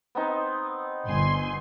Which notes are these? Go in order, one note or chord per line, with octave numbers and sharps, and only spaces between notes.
B3 C4 D#4
G1 G#5 C6